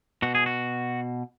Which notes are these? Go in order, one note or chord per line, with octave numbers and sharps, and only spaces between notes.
B2 F#4
G#4
F#4